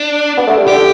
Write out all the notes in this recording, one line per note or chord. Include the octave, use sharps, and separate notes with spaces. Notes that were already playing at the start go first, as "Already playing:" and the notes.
Already playing: D4
B3
A3
G3
D3 G4